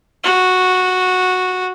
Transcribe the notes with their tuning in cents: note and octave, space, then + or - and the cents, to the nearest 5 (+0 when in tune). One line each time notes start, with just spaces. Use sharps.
F#4 -10